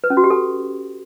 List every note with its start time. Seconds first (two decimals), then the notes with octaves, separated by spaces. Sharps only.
0.04 B4
0.10 C#4
0.17 F#4
0.24 G4
0.30 A4